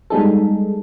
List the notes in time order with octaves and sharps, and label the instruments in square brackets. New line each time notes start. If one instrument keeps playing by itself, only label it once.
[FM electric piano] G3 G#3 B3 D#4 G#4 A4